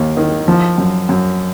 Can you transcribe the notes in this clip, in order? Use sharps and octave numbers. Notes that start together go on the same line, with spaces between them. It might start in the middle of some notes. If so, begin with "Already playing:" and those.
Already playing: D#2
D#3
F3
F#2
F#2